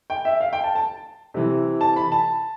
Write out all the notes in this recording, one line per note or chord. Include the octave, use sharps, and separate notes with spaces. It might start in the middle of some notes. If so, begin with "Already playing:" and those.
G5
E5
F5
G5
A5
A5
C3 E3
A5
B5
A5